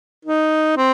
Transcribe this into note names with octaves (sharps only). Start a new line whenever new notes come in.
D#4
C4